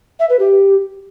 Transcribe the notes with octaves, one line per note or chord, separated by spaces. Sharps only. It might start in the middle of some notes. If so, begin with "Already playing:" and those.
E5
B4
G4